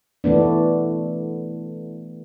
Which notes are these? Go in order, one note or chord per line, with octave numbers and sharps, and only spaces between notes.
E3 A3 B3 D4